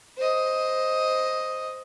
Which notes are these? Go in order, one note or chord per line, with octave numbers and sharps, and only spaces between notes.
C5 D#5